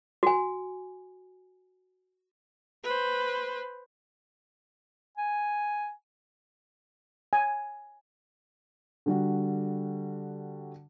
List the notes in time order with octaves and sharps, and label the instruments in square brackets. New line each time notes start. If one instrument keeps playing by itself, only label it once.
[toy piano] F#4 G#5
[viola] B4 C5
[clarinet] G#5
[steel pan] G#5
[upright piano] D3 G3 F#4